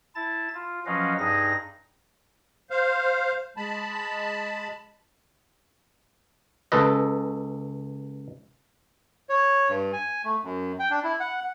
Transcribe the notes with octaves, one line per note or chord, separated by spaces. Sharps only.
E4 A5 A6
F4
F3 F#3 C#4 B4 D#5 F5
G2 D#4 G#4 A#6
C5 F5
G#3 A5 B5
C#2 A4 B4 D#5
C#5
G2
G#5
A3
F#2
G5
D4
E4
F#5